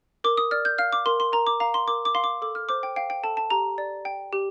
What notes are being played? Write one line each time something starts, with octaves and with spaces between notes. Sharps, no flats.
A#4 D6
D#6
D5 F6
G6
F5 F6
D6
A#4 C6
C6
A#4 A#5
D6
F5 A#5
C6
A#4 D6
D6
F5 C6
D6
A4 D6
F6
C5 D6
G5
F5 G5
G5
A4 A5
A5
G4 A#5
D5
G5
G4